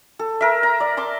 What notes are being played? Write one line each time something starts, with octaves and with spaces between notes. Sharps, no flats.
A4
A#4 E5
A#5
D5
A5 C6 D6